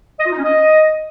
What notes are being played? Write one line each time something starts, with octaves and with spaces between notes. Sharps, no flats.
D#5
F4
D#4
C#4
D#5